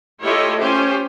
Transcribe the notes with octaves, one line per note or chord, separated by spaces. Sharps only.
A3 E4 F4 G4 C#5 D#5
C#4 F4 G4 C5